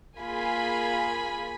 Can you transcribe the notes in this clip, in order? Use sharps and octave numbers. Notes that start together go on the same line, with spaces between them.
A#3 F4 G#4 G#5 B5